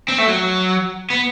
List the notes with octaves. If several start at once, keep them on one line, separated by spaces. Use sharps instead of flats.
C4
A3
F#3
B3